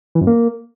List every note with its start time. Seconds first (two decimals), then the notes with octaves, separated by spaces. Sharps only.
0.15 E3
0.21 F#2
0.27 A#3